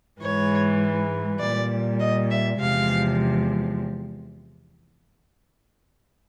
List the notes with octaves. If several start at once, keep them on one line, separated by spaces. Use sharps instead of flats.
G#2 E3 G#3 C#5
A#2 G3 D5
D#5
E5
E2 C3 F3 G#3 F5